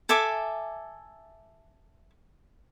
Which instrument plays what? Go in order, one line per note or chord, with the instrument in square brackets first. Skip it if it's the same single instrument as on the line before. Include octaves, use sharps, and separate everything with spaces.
[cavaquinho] A4 E5 G#5 D6